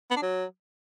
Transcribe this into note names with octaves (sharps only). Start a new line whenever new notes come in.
B3
D4
F#3